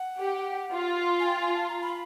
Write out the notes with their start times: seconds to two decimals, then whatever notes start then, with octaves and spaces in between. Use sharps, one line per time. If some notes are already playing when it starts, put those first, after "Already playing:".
Already playing: F#5
0.18 G4
0.73 F4
1.20 G#5
1.27 G5
1.41 G#5
1.55 A5
1.69 A#5
1.82 B5